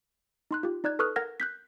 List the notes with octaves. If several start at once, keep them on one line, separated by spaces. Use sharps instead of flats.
D#4 C6 F#6
F4 G4
D#4 D5 F#6 G#6
A4 B4 C#6 D#6 F6 F#6
A#4 F#5 F6 G#6 A#6
F#6 G6 B6